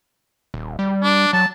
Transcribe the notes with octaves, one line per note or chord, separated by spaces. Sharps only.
D#1
G3
D4
F#3 A5